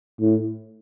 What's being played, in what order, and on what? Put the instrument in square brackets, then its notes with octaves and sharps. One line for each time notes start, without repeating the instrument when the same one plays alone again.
[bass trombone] A2